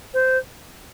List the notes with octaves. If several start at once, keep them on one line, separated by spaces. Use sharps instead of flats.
C5